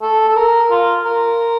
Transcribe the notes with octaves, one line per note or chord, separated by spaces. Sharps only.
A4
A4
A#4
F4
A#4